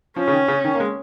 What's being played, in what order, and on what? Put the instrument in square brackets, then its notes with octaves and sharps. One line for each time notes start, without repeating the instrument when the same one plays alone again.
[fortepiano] F3 [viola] C#4
[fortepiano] C#3
D#3
C#3
D#3
A#3
G#3